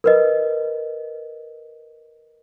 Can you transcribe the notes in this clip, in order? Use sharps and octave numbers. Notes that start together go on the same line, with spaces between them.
A#4 B4 D#5